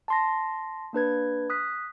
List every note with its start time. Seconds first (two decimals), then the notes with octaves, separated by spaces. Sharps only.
0.08 A5 C6 A#6
0.93 A#3 D4 B4 G#6
1.50 D#6 F#6 B6